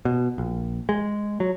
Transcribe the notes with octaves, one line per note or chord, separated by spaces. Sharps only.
B2
A#1
G#3
F#3